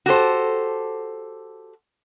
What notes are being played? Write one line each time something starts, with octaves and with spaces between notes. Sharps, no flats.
F#4 G4 A4 C5